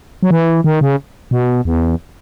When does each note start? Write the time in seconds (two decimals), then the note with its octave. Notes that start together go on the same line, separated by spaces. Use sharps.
0.23 F#3
0.31 E3
0.64 D#3
0.81 C#3
1.31 B2
1.65 E2